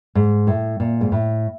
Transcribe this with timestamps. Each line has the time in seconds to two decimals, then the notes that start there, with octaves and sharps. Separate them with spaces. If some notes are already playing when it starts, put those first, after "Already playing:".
0.15 G#2
0.47 A2
0.80 A#2
1.01 G#2
1.12 A2